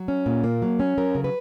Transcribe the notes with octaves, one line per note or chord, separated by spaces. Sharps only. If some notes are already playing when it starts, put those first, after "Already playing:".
Already playing: F#3
C#4
A#2
A#3
F#3
C#4
F#3 A#4
C#3
B4